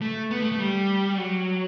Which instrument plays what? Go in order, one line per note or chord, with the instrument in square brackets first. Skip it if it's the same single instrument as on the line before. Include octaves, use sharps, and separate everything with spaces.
[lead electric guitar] A3
B3
A3
A3
G3
F#3